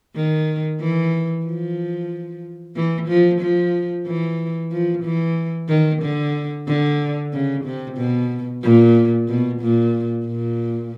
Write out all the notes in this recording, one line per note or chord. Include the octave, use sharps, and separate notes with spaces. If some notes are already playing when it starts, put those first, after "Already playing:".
D#3
E3
F3
E3
F3
F3
E3
F3
E3
D#3
D3
D3
C#3
C3
B2
A#2
B2
A#2
A#2